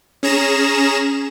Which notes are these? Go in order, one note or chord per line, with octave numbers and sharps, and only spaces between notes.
C#4 G#4 A#5 E7